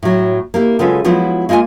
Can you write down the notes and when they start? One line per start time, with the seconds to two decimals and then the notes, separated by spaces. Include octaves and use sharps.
0.03 A2 F#3
0.54 A#3 E4 G4
0.79 C#3 F#3 G#3 F4 A4 B4
1.04 F3 F#3 G#3 B3 E4 F4
1.49 G#3 A#3 F4 F#5 G#5